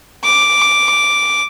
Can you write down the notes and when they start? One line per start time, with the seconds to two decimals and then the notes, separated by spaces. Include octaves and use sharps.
0.25 D6